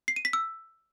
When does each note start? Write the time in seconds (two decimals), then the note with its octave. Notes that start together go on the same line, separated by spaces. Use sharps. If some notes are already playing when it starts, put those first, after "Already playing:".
0.08 C7
0.16 D#7
0.25 B6
0.33 E6